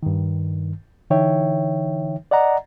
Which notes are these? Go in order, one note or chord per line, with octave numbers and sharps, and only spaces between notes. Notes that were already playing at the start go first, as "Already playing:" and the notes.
G2 D#3
D3 E3 D#4 C#5 E5 G5
D5 D#5 F#5 A#5